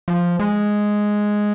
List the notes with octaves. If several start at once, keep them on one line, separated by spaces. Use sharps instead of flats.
F3
G#3